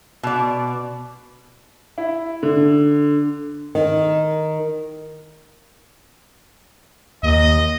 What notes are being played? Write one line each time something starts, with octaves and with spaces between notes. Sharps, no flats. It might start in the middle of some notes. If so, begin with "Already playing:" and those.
B2 D5
E4
D3
D#3
D#2 D#5